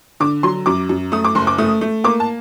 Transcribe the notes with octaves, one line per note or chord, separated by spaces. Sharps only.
D3 D6
F#3 C6
F#2 D6
F#2
A3 D#6
D6
F#1 C6
D6
A3 D#6
A3
A#3 D6
A5